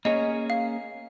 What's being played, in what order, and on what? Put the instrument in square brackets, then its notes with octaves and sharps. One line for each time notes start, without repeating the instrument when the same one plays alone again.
[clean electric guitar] A#3 C#4 G#4 C#5 [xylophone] D#5
[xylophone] F5